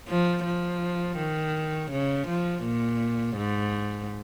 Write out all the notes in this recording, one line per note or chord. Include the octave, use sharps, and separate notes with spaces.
F3
F3
D#3
C#3
F3
A#2
G#2